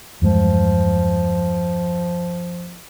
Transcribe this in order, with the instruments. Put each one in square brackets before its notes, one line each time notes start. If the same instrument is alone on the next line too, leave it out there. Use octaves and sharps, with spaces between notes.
[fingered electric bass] E2 G2 G#3 [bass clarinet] F3